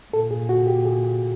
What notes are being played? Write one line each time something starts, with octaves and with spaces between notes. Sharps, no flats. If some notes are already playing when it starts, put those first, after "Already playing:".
A#2 A4
G#4
F#4
G4
G#4